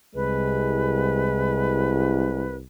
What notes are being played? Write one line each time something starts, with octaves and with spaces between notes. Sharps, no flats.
C2 G#3 B4